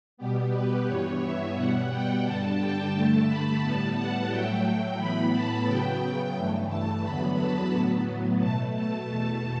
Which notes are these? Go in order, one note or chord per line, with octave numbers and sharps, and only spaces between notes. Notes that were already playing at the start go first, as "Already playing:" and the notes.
B2 G3 B3 G4
B4
G2 E3 B3 C#5
E5
B2 G3 B3 F#5
G5
G2 D3 G3 A5
G5
G2 D3 A3 A5
B5
A2 G3 B3 A5
F#5
A2 F#3 A3 G5
A2 E3 B3 B5
A5
C#3 F#3 B3 G5
G2 E3 A3
A5
E2 D3 F#3 B3 B5
A5
A2 F#3 B3
B2 A3 A5
A5
E2 B2 A3 A5